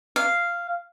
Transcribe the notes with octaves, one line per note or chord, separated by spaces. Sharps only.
F5